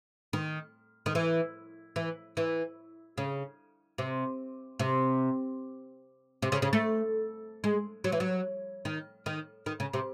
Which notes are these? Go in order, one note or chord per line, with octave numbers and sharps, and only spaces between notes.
D#3
D#3
E3
E3
E3
C#3
C3
C3
C3
C#3
C#3
A3
G#3
F#3
E3
F#3
D#3
D#3
D#3
C#3
C3